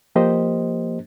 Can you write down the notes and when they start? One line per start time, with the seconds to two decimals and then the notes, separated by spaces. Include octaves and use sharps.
0.15 F3 A#3 G4 C5 D#5